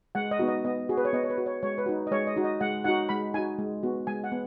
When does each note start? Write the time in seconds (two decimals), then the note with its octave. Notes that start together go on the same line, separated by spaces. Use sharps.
0.15 G#3 F#5
0.31 D#5
0.39 B3 D#4 F#4
0.48 D#5
0.65 B3 D#5
0.89 F#4 G#4
0.97 B4
1.05 C#5
1.13 B3 D#5
1.24 C#5
1.30 B4
1.38 F#4
1.46 C#5
1.63 G#3 C#5
1.78 B4
1.86 D#4 F#4
2.07 D#5
2.11 G#3 C#5
2.27 D#5
2.36 D#4 F#4
2.44 D#5
2.61 G#3 F#5
2.84 D#4 F#4 F#5
3.09 G#3 B5
3.34 D#4 F#4 G#5
3.58 G#3
3.83 B3 F#4
4.07 G#3 G#5
4.24 F#5
4.32 B3